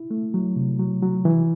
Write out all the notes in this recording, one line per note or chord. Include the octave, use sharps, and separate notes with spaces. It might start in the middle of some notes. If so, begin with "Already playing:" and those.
Already playing: E4
A3
F#3
C3
F#3
F#3
E3